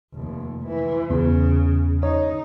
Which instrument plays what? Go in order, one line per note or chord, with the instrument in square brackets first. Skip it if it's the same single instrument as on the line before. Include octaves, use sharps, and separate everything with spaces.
[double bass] F1 D#2
E3
[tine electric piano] E2 [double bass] C#3
[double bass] D#4 [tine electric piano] C#5